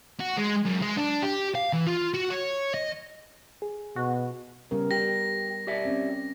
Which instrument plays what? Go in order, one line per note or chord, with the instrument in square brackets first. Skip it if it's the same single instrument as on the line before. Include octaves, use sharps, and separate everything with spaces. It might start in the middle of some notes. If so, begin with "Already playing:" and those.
[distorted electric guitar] F#4
G#3
F#2
G#3
D4
G4
F5
E3
F4
F#4
C#5
D#5
[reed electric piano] G#4
[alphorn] B2 [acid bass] F#4
[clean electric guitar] C#3 [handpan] G3 B3 A#4
[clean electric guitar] G4 [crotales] A#6
[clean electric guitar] G4 D5 E5
[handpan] C4 C#4